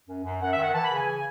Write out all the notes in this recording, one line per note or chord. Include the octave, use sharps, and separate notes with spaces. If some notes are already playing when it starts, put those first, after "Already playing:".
F#2
F#2
F#2 F#5
E5
D#3 F#5
E3 A5
B5
C#3
G#5